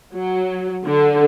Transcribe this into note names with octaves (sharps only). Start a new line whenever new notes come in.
F#3
D3